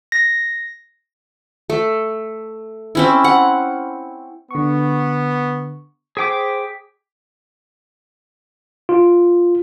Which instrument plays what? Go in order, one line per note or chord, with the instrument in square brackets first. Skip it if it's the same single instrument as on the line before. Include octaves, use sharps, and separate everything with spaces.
[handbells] A#6
[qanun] A3
C4 C#4 E4
F#5
[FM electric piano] D3 C#6 [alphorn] B3
[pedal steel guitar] G#4 G5 D6 [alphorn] C5 [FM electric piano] B6
[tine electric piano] F4